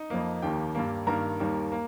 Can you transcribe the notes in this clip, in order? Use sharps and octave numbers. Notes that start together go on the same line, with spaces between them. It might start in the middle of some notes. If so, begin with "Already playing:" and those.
Already playing: D#4 D#5
F2 F3 A#3
D#2 D#3 A#3 G4 G5
G2 G3 A#3
G2 D#3 G3 A#3 A#4 A#5
D#2 D#3 G3 A#3
A#3